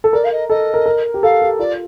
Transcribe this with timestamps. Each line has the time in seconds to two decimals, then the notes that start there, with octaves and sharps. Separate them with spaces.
0.04 A4
0.13 A#4 D5
0.24 F5
0.32 D#5
0.50 A4 D#5
0.74 A#4
0.86 A#4
1.14 G4
1.23 A4 F5
1.42 G4
1.59 F4 D5